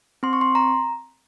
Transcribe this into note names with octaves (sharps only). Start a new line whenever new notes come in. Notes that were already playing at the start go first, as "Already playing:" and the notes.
C4 C6
C#6
C6
A#5